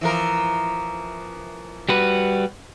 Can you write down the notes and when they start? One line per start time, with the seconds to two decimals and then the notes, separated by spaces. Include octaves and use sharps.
0.01 E3 F3 A#4
1.89 G3 F#4 B4